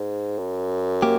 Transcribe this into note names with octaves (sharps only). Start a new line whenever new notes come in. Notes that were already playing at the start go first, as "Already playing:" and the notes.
Already playing: G#2
F#2
A#3 G4